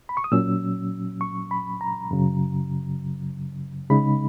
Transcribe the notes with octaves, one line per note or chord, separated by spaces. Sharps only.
B5
C#6
D#6
A#2 F#3 C#4 E6
C#6
B5
A#5
F#2 C#3 F#3
C#3 G#3 D#4 B5